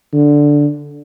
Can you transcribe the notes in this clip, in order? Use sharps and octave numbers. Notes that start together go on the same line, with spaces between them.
D3